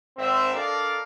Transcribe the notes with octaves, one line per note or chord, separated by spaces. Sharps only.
G#1 C4 E5
D4 A4 A#4 D5 D#5 F5